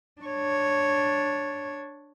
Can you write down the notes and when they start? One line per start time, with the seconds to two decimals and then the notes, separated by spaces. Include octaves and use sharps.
0.22 D4 C#5